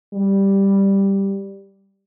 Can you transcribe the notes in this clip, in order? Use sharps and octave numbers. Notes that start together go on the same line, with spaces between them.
G3